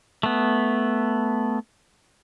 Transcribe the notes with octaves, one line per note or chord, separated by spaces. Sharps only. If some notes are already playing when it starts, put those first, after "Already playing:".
A3 B3